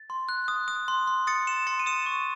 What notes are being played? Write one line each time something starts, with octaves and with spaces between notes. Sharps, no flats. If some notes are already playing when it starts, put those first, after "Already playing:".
Already playing: A6
C6
F#6
D#6
D#6
C6
C6
D#6 A6 C#7
C6 C#7 E7
C6 A6 C#7
D#7
D#6 C#7 E7
C#6